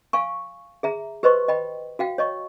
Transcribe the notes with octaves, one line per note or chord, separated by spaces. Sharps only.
F5 G#5 C#6
G#4 E5 A#5
G4 B4 C5 D#5 C6 C#6
D#5 G5 B5
F#4 F5 G5
C#5 D#5 C#6